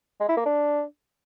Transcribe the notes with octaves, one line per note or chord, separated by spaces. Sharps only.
G#3
E4
A#3
D4